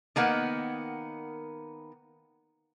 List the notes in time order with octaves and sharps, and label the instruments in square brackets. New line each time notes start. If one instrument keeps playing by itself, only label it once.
[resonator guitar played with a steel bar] D#3 A#3 B3 F#5